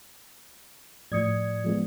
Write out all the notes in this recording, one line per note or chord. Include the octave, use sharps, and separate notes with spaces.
A2 F3 D5 D#6 G#6 C#7
F3 G#3 B3